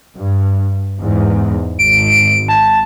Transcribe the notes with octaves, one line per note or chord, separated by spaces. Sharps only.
G2
E2 G#2
G#1 D7
A5